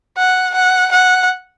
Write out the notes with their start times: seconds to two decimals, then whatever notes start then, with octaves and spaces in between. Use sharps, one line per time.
0.18 F#5
0.55 F#5
0.92 F#5